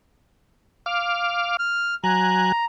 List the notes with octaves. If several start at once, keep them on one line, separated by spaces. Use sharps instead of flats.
F5 D6 F6
F6
F#3 G#5 A#5 F#6